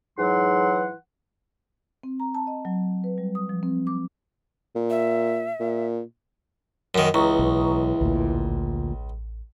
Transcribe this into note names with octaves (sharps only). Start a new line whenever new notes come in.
G#2 E3 F#3 F#5 C6
C4
A#5
A5
D#5
F#3
B4
G3
D#6
F3
C4
D6
A#2
E5
A#2
F#2 D#3
C#2 E3 A#5 C#6 D#6
B1
A1 D2 A#2